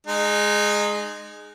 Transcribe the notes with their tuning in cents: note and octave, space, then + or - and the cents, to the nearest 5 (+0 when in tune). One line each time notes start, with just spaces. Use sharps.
G#3 +5 D#4 -25